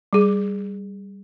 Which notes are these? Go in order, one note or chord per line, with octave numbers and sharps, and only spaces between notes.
G3 G#4